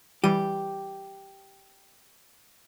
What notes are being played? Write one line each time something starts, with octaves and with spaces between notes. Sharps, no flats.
E3 G3 G4 D#7